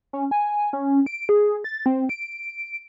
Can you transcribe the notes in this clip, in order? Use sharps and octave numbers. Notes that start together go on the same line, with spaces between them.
C#4
G#5
C#4
D7
G#4
A6
C4
D7